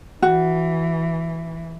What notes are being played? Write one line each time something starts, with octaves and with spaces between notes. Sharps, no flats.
E3 F#4